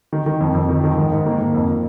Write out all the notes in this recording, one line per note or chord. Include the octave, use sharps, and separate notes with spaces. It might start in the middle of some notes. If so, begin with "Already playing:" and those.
D#3
D#3
F2
F2
D#3
D#3
G#2
G#2
D#3 A#3
D#3
F2